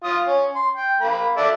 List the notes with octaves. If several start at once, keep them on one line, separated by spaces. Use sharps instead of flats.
F4 D#6
C#4
C6
G5
A#3 B5
A4 D5 E5